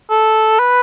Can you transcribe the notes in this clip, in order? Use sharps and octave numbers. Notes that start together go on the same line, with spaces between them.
A4
B4